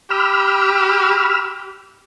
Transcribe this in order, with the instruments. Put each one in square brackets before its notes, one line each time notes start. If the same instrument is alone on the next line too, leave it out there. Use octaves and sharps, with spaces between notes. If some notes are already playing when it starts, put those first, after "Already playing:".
[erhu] G4 [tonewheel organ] B5 E6 F6